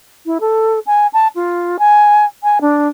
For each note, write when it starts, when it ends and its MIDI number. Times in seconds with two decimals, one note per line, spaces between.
0.26 0.38 64
0.41 0.79 69
0.87 1.07 80
1.13 1.28 81
1.36 1.77 65
1.79 2.25 80
2.43 2.58 80
2.61 2.88 62